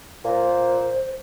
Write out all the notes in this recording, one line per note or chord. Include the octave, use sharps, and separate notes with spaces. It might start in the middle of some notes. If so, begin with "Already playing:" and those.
A#2 C5